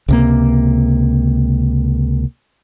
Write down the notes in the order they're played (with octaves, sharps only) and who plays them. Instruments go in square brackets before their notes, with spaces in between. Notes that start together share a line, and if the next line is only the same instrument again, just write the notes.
[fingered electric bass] C#2 C3 A#3